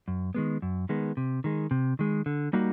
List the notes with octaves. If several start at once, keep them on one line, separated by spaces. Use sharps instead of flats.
F#2
D#3 G#3 B3
F#2
D#3 G#3 B3
C3
D#3 G#3
C3
D#3 G#3
D3
G3 A#3 D#4 F#4